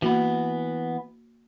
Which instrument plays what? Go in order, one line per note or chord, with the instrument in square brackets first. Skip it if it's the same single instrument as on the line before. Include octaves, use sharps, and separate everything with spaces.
[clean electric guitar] E3 B3 [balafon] A#3 F#4